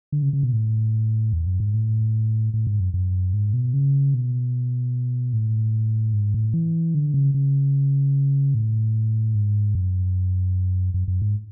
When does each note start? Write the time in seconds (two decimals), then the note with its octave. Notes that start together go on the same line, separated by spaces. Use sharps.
0.12 D3
0.22 C#3
0.33 C#3
0.43 B2
0.53 A2
1.33 E2
1.46 F#2
1.60 G#2
1.74 A2
2.53 A2
2.67 G#2
2.80 F#2
2.94 F#2
3.33 G#2
3.53 B2
3.74 C#3
4.14 B2
5.33 A2
6.13 G#2
6.34 A2
6.54 E3
6.95 D3
7.14 C#3
7.34 C#3
8.54 A2
9.35 G#2
9.75 F#2
10.94 F#2
11.08 F#2
11.22 G#2